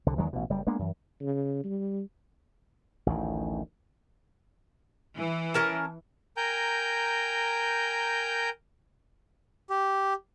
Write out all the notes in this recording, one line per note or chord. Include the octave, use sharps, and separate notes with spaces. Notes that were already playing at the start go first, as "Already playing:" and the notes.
C2 D3
E2 D#3 F#3 G#3
A1 B2
F#1 G3
G#3 A#3 B3 D4
F#2 E3
C#3
G3
A1 D2 D#3
E3
C#4 A#4 A5
A#4 G5 G#5 A#5 G6
G4